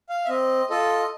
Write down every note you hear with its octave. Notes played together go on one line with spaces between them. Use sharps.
F5
E5
C4 D#5
F4 A4 D#5